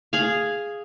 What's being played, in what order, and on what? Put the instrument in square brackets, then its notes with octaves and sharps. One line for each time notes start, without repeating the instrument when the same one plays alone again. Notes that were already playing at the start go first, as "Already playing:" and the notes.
[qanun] G#4 F5